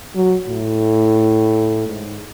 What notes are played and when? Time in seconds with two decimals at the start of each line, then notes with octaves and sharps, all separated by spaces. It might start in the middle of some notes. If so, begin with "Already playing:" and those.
0.15 F#3
0.48 A2
1.87 G#2